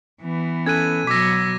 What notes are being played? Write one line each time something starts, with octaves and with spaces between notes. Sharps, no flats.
E3 B3
C#4 A4 F#6 G#6 D#7
B2 F#3 D6 E6 A#6 B6